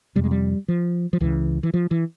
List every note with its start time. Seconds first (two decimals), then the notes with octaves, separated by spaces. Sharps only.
0.16 F2 C3 G3
0.24 G#3
0.31 G3
0.68 F3
1.13 F3
1.21 C#2 C#3 E3
1.63 E3
1.74 F3
1.91 E3